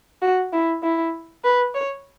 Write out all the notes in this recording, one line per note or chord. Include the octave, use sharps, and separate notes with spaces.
F#4
E4
E4
B4
C#5